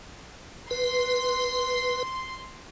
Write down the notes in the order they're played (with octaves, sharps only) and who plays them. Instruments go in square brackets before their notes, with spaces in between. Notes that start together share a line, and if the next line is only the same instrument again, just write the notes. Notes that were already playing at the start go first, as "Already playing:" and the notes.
[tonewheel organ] B4 [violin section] C6